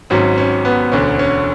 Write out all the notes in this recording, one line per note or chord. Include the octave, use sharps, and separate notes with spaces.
G#1 G#2 F#3 C#4
C#4
B3
E1 D2 D3 C#4
C#4